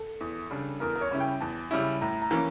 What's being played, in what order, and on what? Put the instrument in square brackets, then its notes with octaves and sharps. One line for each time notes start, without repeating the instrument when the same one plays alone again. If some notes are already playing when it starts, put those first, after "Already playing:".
Already playing: [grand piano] A4
[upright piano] E2
C#3 G3 D4
[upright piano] E2 [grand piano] A#4
[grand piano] A#4
C#5
[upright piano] C#3 G3 C#4 E4
[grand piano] G5
[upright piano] E2 [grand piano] A5
[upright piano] C#3 G3 C#4 E4
[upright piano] A2 [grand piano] A#5
[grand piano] A#5
[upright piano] E3 A#3 C#4